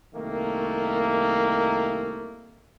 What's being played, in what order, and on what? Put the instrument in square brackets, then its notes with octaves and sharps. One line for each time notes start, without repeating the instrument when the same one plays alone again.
[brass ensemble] C2 D#3 A3 A#3